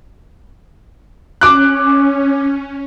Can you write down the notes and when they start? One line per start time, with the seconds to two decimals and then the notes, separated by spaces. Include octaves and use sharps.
1.41 C#4 D6 F#6